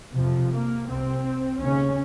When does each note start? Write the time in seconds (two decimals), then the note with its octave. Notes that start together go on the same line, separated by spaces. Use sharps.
0.15 F2 C3 F3
0.52 A#3
0.87 C2 C3 C4
1.59 D#2 C#3 C#4